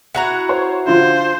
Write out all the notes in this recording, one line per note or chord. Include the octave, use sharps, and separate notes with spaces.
E4 F#4 F#5 A#5
C5 C#5
D3 F3 F4 C5